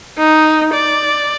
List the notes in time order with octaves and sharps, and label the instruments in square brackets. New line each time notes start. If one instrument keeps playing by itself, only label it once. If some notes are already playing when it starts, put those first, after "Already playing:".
[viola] D#4
D5